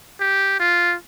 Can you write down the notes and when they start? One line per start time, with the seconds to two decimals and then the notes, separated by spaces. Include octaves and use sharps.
0.20 G4
0.60 F4